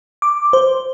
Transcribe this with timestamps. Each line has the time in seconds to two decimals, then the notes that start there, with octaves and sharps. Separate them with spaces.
0.22 D6
0.53 C5